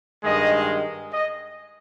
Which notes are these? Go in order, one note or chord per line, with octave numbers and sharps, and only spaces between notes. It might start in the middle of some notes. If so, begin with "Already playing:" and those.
G2 D#3 G#3 D#5
D#5